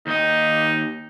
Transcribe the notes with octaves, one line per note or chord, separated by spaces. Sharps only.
D#2 D#4 D#5